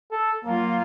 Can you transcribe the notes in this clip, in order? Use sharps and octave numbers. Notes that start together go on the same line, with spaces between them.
A4
F#3 A#3 F4